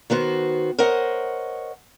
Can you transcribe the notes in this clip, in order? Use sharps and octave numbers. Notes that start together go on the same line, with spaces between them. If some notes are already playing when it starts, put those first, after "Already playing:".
D#3 B3 F#4 C5
A#4 C5 C#5 D#5 F#5